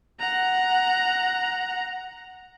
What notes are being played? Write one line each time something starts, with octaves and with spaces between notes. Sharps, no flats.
F#5 A#5